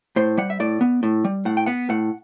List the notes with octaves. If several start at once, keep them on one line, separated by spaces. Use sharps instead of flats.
A2 C5
G3 F#5
E5
A2 D5
B3
A2
G3
A2 F#5
G5
B3 F#5
A2 F#5